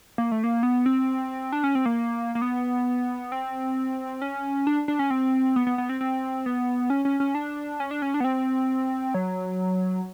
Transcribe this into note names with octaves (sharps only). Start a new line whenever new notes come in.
A#3
A3
A#3
B3
C4
D4
C#4
C4
A#3
A#3
B3
C4
C#4
D4
D4
C#4
C4
B3
B3
B3
C4
C4
B3
C#4
C#4
C#4
D4
C#4
D4
C#4
D4
B3
C4
F#3